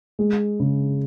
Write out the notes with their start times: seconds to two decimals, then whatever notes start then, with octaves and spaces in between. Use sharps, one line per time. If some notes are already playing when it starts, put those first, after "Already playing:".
0.19 G#3
0.60 C#3